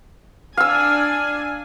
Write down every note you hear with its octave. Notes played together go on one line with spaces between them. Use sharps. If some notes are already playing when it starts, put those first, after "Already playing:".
D4 F5 G#5 E6